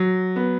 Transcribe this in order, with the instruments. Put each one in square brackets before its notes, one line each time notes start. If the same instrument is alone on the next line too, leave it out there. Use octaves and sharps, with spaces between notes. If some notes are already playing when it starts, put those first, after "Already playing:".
Already playing: [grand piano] F#3
B3